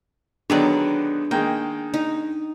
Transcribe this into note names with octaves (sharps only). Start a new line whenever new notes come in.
D3 D#3 F#3 B3 D4 G#4 D5
D#3 G#3 A#3 G5
D#4